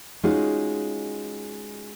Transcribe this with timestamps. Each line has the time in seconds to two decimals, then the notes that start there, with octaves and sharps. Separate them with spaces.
0.23 G#3 C#4 D#4 F4 F#4